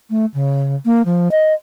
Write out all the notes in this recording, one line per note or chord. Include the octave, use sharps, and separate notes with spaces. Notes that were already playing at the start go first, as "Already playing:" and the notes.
A3
C#3
A#3
F3
D#5